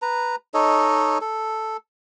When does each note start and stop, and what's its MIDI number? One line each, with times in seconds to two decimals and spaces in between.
0.02 0.36 71
0.02 0.36 82
0.54 1.18 63
0.54 1.18 69
0.54 1.18 73
0.54 1.18 75
1.21 1.77 69